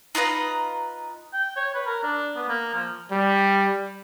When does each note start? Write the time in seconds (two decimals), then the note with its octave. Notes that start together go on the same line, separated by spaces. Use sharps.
0.15 D#4 F4 B4 A#5
1.33 G5
1.56 C#5
1.74 B4
1.86 A#4
2.03 D4
2.36 B3
2.49 A#3
2.74 F3
3.12 G3